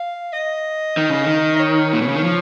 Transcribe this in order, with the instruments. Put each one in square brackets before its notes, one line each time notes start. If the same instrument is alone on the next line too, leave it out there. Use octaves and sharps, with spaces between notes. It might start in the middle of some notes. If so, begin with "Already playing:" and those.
Already playing: [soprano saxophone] F5
D#5
[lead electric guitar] D#3
C#3
D#3
[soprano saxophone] D#5
C#5
[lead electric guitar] A#2
B2
C#3
D#3
F3